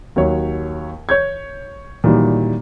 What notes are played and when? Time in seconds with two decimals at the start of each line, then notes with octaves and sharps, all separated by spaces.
0.16 D#2 F#3 C#5
1.09 C#5 G6 G#6
2.04 A#2 D#3 E3 F#3 G3